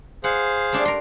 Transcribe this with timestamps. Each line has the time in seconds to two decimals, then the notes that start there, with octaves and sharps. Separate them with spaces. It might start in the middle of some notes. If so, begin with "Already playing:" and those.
0.24 G#4 C5 F5 F#5
0.73 A3 D4 G4
0.85 A#4 C6